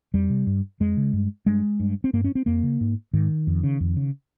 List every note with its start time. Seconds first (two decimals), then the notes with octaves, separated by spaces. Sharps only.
0.14 F2 G3
0.30 C3
0.47 G2
0.80 F2 G#3
0.97 C#3
1.13 G2
1.46 G2 G#3
1.80 G2
2.04 C4
2.13 G2 A#3
2.24 C#4
2.35 C4
2.46 F2 A#3
2.63 C#3
2.81 G#2
3.13 G#2 D#3
3.47 F2
3.63 C#3
3.80 F2
3.96 C#3